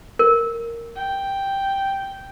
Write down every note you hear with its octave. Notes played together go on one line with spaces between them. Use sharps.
A#4
G5